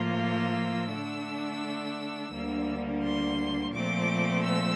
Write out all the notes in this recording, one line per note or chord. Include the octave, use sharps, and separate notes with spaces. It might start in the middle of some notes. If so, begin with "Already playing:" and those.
Already playing: A2 F3 A#3 F4
E6
D3 A3 D4
D2 D3 G3 A#3
C6
A#2 F3 A3 C4 D6
E6